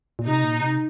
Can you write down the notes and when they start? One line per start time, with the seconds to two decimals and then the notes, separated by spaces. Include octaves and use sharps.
0.19 A#2
0.27 C3 D#4
0.43 A#2
0.60 C3